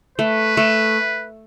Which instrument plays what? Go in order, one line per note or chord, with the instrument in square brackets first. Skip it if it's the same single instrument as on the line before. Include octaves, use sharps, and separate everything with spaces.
[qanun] A3 [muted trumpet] B4
[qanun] A3